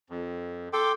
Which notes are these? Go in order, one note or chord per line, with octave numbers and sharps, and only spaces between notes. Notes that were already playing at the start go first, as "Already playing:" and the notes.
F2
A4 G5 C6 D6